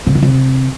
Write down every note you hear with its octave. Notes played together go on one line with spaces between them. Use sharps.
C3
B2
C3